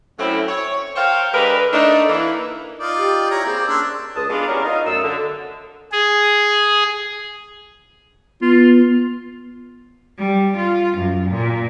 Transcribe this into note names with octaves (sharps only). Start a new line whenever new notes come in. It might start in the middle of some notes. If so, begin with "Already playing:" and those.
A2 F#3 A3 C4 C#4 E4
C#5
A#4 C5 C#5 F5 G5
D3 G#3 G4 A#4 B4
A3 D4 D#4
E3 A#3 E4
D#4 F4 D5
G4
E4 C#5 A#5
A#3 C4 G#4 D5
C#4 D4 C6 E6
C#2 A5 D#6
G#3 B3 D4 F4
G3 C#4 E4 F#4 A#4
D#4 F4 D#5 F5
F#2 A3 D#6 E6
D3
G#4
B3 F4
G3
F4
F#2
A#2